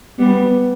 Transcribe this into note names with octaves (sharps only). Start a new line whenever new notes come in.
G3 B3